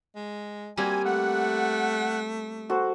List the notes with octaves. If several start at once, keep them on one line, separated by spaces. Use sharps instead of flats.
G#3
G3 A#3 C4 F#4 G#5
A3 F#5
F#4 A4 C5